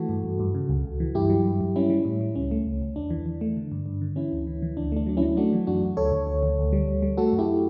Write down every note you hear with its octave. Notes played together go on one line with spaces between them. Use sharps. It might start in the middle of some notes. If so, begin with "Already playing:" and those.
Already playing: E3 A3 F#4 A4
G2
G2
G2
C#3
C#2
C#2
E3
G2 E4 G4
F#3
G2
G2
G3 C#4 E4
G3
A2
G3
C#2 C#4
A3
C#2
C#2
E2 D4
E3
E3
A3
D3
G2
G2
D3
E3 C#4 E4
D2
E3
E3
D2 D4
A3 D4
F#3 D4
C#4 E4
F#3
A3 D4 F#4
E3
F#2 D4 F#4
F#2
D2 A4 C#5
D2
D2
D2
D2
G3
D2
G3
A3 F#4 A4
F#2
E4 G4